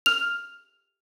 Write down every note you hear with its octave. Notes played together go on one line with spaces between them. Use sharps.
F6 F7